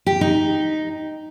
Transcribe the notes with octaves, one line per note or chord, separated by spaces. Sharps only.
G4
D#4